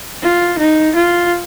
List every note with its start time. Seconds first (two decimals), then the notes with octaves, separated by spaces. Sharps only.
0.22 F4
0.59 D#4
0.95 F4